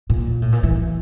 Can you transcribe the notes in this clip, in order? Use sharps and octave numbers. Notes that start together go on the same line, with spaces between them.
A#2
A2
A#2
E3